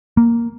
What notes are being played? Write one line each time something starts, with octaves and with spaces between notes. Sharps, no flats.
A#3